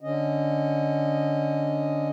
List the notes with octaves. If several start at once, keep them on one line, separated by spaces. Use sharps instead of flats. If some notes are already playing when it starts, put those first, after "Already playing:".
D3 C#4 D#5